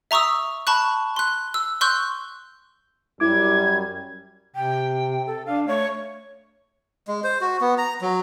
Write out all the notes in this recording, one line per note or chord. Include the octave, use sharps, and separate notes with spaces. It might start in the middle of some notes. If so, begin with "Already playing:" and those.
E5 A#5 C#6 D#6 E6
A5 B5 C#6 F#6
C6 F#6
E6
C6 C#6 E6 F#6 G6
F#2 G3 E4 D6 G#6
C3 G5
A4
D4 F5
A3 C#5
G#3
C5
F#4
B3
A#5
F#3